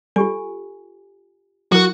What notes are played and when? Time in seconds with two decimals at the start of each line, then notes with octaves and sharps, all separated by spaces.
0.16 G3 F4 G4 A4 G#5
1.72 F#3 E4 F#4 A#4